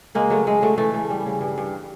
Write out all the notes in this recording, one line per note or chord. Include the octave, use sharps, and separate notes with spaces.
C#3 G#3 A#3
F#3 A3
F#3 G#3
F#3 A3
E3 A3
C#3
G3
C#3
G2
G2